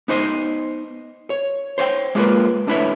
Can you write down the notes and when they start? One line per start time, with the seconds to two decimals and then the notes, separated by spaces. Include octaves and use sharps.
0.08 B3 D#4 C5 D#5
1.30 C#5
1.78 C5 C#5 F5 G5
2.15 G#3 A#3 F4 G4 A#4 B4
2.67 A3 D4 E4 B4 C#5 E5